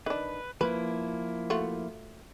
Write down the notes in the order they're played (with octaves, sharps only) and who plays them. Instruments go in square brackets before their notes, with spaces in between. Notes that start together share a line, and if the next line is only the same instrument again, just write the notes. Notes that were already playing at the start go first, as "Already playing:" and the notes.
[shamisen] D#3 D4 [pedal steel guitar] B4
[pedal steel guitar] F3 A#3 E4 [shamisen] B4
[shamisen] A3 F4 F#4